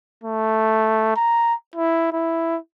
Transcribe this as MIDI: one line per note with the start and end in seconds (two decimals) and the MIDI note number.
0.24 1.13 57
1.16 1.54 82
1.76 2.11 64
2.13 2.58 64